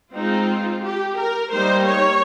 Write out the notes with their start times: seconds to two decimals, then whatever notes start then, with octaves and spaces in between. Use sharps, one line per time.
0.14 G#3 C4 D#4 F4
0.84 G4
1.17 A#4
1.52 G3 A#3 D#4 C5
1.87 C#5